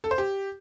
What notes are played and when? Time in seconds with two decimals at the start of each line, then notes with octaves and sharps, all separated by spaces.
0.04 A4
0.11 C5
0.18 G4